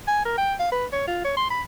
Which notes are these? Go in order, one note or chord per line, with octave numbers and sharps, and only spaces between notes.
G#5
A#4
G5
F5
B4
C#5
F4
C#5
C6
B5